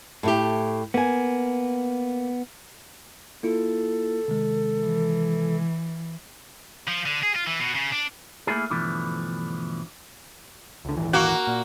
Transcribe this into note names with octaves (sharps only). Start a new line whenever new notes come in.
A2 A3 G4
A#3 B3 G#5
A#3 E4 F4 A4
C3 D#3 G#3
E3
F3
D3
G#4
F4
E3
B2
C#3
D4
A3 A#3 E4 F4 G#4
G2 B2 D3 E3 F3 A3
C#2 D3
D#1 G#1 E3
A#3 F#4
A#2